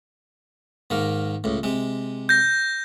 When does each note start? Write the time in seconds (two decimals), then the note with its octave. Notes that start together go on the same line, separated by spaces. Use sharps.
0.90 G#2 D#3 A#3
1.44 C#2 A2
1.63 C3 G#3
2.29 G6 A#6